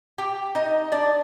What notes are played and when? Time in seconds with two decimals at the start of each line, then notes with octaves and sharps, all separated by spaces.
0.18 G4 G5
0.55 D#4 D#5
0.92 D4 D5